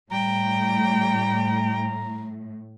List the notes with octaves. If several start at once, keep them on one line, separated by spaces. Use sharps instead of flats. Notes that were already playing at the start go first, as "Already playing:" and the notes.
A2 G3 G5 A#5